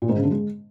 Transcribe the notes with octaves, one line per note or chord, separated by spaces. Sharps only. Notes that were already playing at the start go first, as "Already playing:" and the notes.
A#2
G#2
C#3
D3
G#3